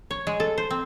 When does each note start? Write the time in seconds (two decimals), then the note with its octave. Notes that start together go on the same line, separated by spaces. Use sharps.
0.11 C#5
0.27 G#3
0.40 A4
0.58 C5
0.70 C4